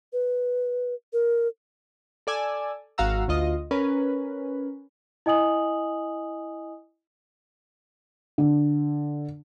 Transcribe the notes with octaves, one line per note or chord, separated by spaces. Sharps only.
B4
A#4
A4 D5 G#5 E6
G#1 F#4 F5 F#5 A#5 E6
D2 F4 D#5
C#4 A#4 B4
E4 D#5 G#5 D#6 F#7
D3